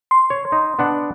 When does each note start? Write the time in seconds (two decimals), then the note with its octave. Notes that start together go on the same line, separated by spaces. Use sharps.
0.11 C6
0.30 C#5
0.52 D#4
0.79 B3 D4 F#5